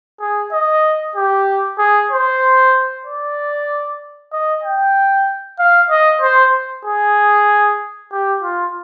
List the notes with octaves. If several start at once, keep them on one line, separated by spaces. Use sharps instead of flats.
G#4
D#5
G4
G#4
C5
D5
D#5
G5
F5
D#5
C5
G#4
G4
F4